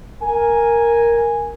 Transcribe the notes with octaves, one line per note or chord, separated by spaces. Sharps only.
A#4 G#5